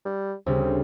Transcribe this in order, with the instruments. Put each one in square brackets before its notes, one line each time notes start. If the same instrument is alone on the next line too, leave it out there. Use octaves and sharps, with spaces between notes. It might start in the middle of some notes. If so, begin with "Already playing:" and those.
[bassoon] G3
[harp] D2 C#3 G3 [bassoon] C4